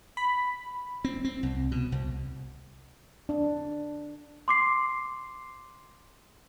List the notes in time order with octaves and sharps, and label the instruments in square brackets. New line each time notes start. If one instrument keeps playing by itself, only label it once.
[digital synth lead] B5
[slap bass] C4
C4
C2
B2
C2
[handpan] D4
[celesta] C6 D6 C7